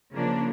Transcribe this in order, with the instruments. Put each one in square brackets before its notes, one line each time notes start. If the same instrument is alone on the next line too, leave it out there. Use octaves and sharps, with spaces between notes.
[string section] C#3 F3 A#3 D4